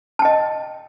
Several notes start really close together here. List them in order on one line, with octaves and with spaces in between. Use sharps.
A5 G5 D#5